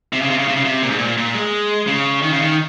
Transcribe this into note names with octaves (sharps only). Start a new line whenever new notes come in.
C3
C#3
C3
C#3
C3
C#3
C3
A#2
G#2
A#2
A#2
G#3
C#3
D#3
C#3
D#3